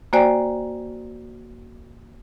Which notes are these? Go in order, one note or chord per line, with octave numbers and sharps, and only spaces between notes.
A#3 F#4 C5 D5 G5 G#5